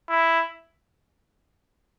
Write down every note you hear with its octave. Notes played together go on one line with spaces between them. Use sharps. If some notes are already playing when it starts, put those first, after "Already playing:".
E4